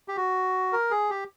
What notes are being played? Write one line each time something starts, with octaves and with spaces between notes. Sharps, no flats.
G4
F#4
A#4
G#4
G4